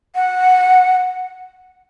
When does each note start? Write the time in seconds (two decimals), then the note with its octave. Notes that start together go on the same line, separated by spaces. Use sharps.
0.15 F#5